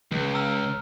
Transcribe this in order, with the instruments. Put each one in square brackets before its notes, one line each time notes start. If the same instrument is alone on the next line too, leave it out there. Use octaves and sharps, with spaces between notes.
[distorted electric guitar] C#2 [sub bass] C#3
[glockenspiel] A#5 E6 F6